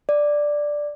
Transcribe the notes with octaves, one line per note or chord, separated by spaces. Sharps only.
D5